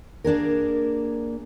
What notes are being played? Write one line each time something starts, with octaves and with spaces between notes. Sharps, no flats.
A#3 D4 G#4 A#4